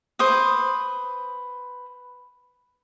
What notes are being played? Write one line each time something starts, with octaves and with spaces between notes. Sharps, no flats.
B4 C5 D6 D#6